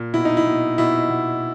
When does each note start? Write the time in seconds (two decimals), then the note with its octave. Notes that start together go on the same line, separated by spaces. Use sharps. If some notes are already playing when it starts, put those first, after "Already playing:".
Already playing: A#2
0.14 B2 E4
0.25 D#4
0.37 E4
0.47 B2
0.78 B2 E4
1.10 B2